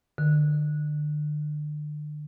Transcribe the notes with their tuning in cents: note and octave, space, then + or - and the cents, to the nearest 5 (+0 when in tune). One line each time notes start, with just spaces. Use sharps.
D3 +35